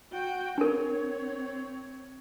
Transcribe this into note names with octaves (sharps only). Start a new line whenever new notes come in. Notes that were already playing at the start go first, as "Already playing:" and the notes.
F#4 G5
C4 D4 A#4 C#5